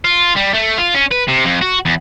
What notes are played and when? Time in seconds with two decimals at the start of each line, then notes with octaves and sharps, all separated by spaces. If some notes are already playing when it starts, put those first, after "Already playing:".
0.05 F4
0.37 G3
0.55 A3
0.78 F4
0.95 C#4
1.12 B4
1.28 C3
1.45 F2
1.62 F#4
1.86 E2